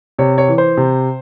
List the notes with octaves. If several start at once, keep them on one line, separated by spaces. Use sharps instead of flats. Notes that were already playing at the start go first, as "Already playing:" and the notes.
C3 C#5
C#5
E3
C5
C3